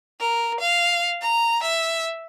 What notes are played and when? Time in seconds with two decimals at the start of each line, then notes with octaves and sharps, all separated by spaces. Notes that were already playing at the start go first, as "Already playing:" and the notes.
0.20 A#4
0.59 F5
1.21 A#5
1.63 E5